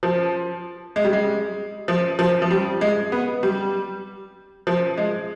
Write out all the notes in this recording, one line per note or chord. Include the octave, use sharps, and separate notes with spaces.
F3
G#3
G3
G#3
F3
F3
F3
G3
G#3
B3
G3
F3
G#3